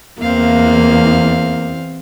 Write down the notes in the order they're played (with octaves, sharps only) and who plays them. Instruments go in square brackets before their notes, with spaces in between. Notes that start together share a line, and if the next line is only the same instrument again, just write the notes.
[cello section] E2 [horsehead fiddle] A#3 [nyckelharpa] C4 F5